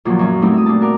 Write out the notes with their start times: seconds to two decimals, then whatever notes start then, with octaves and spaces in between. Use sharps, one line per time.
0.05 E2 A#2 D#3 F3 F#3
0.19 F#2 C#4
0.42 F#3 G3 A3 C4 D#4 E4
0.53 E5 D#6
0.66 A#2 D4 E4 A5
0.80 F#4 A#4 D5